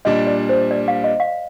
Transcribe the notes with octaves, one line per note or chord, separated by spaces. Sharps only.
A#2 G3 D4 D#5
D5
C5
D5
F5
D#5
F5